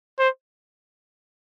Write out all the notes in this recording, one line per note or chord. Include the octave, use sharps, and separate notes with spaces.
C5